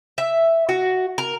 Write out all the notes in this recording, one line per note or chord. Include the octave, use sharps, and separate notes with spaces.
E5
F#4
A#4